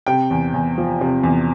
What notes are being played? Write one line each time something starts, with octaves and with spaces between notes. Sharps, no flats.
C3 G5
E2
E2
F3
C3
E2